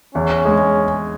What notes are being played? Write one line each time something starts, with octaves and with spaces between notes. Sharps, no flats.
E2 C#4
G#3